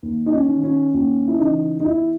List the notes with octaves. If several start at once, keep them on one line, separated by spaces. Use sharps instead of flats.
D#2
D#4
C#4
D#3
C#4
D#2 C#4
E4
C#3 E3 D#4
D#4
E2 E4